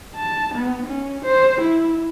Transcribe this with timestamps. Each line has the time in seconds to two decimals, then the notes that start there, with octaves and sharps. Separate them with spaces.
0.15 A5
0.54 B3
0.86 C#4
1.25 C5
1.61 E4